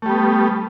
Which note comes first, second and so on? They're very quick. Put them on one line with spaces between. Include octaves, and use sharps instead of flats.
A3 G3 B3